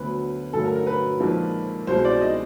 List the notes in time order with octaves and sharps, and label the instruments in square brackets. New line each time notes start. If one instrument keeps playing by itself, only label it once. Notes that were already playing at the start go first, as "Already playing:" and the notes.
Already playing: [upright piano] D2 D3 F#3 B3 B4
G2 D3 F#3 A3 A4
A#4
A#4
B4
A#1 G#2 F3 A#3
C2 B2 G#3 C5
D5
D#5